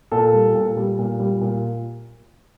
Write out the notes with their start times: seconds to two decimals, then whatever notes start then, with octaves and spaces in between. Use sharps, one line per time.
0.12 A#2 A4
0.33 G3
0.55 A#2
0.77 G3
0.98 A#2
1.20 G3
1.41 A#2